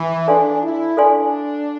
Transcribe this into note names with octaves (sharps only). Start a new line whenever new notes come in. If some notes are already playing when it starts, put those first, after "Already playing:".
Already playing: E3
D4 A4 D5 F5 G#5 C6
E4
D4 A4 D5 F5 G#5 C6